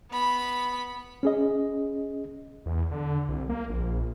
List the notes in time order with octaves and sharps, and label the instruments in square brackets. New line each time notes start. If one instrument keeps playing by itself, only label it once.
[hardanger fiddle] B3 B5
[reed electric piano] C#4 G#4 D#5
[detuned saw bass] E2
D3
C2
A#3
A#1